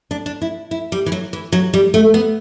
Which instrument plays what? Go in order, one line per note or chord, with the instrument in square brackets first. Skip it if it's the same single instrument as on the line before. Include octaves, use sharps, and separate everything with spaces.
[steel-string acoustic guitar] D4
D4
E4
E4
G3
E3
F#3
E3
F#3
G3
A3
B3